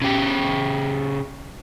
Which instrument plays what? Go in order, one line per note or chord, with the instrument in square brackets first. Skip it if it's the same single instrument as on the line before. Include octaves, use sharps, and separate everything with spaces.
[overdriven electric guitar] C#3 G4